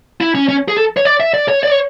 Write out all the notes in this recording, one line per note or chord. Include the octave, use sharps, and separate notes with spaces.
E4
C#4
C#4
G#4
A4
C#5
D5
E5
D5
C#5
D5
C#5